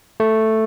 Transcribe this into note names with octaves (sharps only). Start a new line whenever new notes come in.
A3